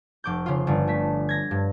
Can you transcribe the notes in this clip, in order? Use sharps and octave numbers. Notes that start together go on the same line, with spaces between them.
F1 D6 G6
C#3 F4
G1 D3
A3 B6
G#6 A#6
G2